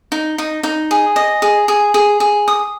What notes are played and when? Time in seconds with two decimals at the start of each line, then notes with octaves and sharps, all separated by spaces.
0.12 D#4
0.38 D#4
0.63 D#4
0.91 G#4
1.16 D#5
1.42 G#4
1.68 G#4
1.94 G#4
2.20 G#4
2.48 D#6